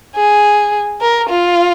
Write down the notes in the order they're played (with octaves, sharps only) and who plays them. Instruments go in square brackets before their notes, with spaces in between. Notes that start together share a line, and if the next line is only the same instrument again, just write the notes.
[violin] G#4
A#4
F4